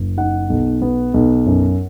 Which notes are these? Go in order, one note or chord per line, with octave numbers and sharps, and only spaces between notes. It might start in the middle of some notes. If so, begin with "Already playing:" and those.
Already playing: F#1
D#4 F#5
B1
B3
B1
F#2